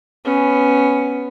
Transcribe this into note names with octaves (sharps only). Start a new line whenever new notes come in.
B3 C#4